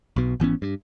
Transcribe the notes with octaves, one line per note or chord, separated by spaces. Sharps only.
B1 B2
G#1 E3 B3 C#4
G2